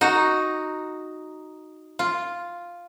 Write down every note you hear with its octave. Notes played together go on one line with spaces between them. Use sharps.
D#4 F#4
F4